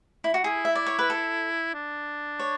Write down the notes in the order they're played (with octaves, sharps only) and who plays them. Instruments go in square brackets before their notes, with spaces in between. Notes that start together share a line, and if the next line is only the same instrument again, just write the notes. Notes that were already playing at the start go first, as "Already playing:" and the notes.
[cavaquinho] E4
F#4
[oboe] E4 [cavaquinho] G#4
[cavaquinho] E5
D5
C#5
B4
A4
[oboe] D4
[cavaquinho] C#5